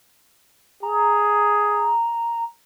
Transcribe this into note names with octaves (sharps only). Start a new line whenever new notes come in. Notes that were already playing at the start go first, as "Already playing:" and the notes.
G#4 A#5